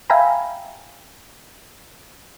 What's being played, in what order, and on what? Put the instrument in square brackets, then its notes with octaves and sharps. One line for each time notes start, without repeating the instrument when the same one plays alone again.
[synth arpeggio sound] E5 F5 G5 G#5 A#5 B5